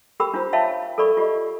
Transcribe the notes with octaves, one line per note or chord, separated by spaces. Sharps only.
G4 A#4 G5 B5 E6
D4 F4 A#4 C5 A#5
C#5 E5 F5 G5 A5 B5
A4 A#4 D5 B5 C#6
F4 G4 D5 D#5